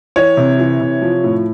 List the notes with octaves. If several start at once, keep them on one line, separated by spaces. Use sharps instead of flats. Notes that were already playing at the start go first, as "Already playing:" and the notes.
E3 C#5
C3
E3
C3
F3
A2